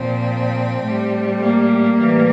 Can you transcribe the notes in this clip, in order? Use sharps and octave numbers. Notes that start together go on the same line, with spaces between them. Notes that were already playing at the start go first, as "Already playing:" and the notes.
Already playing: A#2 F3 C4
A2 G3
A#3
A2 E3 G3